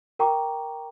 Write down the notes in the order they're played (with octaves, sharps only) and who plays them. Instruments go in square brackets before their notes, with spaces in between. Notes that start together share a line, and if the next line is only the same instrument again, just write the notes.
[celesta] A#4 G5 A#5 C#6 D6